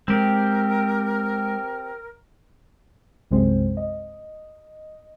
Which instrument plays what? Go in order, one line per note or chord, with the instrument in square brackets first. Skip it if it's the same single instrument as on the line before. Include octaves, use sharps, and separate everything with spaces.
[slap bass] G#3 [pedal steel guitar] C4 G4 [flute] A#4
[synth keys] B1 F#2 C3 G#3 C4 C5
D#5